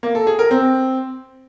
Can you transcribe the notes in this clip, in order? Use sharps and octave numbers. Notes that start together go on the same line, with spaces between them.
A#3
A4
G#4
A#4
C4